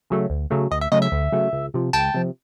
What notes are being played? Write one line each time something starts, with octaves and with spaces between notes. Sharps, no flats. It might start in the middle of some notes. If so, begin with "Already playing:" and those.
C#3 F#3 A3
D2
C#3 F#3 A3
D2 D#5
E5
C#3 F#3 A3 D#5
E5
D2
C#3 F#3 A3
C#2
C3 F3
C#2 G5 A5
C3 F3